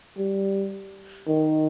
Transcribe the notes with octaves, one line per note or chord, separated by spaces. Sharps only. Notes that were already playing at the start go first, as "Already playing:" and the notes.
G3
D#3